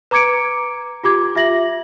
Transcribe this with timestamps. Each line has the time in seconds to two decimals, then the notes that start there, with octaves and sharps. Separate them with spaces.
0.11 B4 A#5 D6 G#6 C#7 D7
1.03 F4 G4 D6 G#6
1.35 F4 E5 A#6 F#7